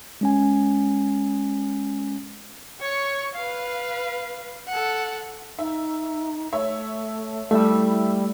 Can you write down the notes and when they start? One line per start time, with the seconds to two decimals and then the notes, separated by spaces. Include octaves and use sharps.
0.21 G#3 C#4 G#5
2.80 C#5 C#6
3.35 B4 F5
4.68 A4 F#5
5.59 D#4 E5
6.53 A3 C#5 E5
7.51 G3 A3 E4 E5 E6